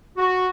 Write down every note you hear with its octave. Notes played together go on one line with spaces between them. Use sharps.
F#4